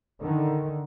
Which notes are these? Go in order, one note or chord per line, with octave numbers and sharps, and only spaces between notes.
D3 D#3